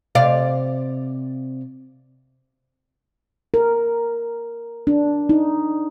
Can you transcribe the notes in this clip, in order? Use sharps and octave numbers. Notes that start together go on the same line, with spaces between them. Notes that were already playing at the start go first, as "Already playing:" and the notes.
C3 D5 F5
A#4
D4
D#4